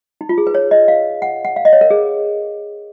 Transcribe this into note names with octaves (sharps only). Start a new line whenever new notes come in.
D#4
F4
G#4
B4
C#5
D#5
F5
F#5
F#5
F5
D#5
C#5
A#4
G#4